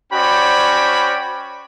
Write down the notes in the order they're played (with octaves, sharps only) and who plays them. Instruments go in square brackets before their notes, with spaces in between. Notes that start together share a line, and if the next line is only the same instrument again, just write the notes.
[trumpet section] C#4 F#4 C5 D5 G5 B5